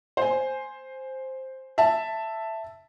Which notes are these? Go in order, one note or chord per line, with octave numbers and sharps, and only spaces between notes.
C5 G#5
E5 A5